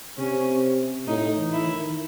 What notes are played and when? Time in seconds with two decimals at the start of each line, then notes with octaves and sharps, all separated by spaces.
0.18 C3 C#4
1.08 A2 D#4
1.38 E3
1.53 E4
1.67 D#3